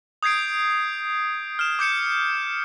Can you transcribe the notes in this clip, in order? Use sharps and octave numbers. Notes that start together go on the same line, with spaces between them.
D#6 G6 G#6 C7 D7
F6 E7
D6 G6 C#7 E7